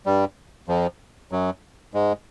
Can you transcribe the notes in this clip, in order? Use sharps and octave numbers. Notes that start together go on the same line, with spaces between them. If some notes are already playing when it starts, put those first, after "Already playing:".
G2 G3
F2 F3
F#2 F#3
G#2 G#3